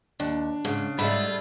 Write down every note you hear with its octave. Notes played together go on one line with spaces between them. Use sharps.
D#2 D4
G#2 C#3
G#2 G3 A3 E4 F4 B5